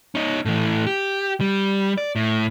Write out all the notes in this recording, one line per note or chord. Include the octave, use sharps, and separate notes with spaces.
C#4 D#4
A2 E3
G4
G3
D5
A2